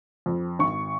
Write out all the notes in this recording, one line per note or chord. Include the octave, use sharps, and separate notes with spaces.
F2
G#1 C#6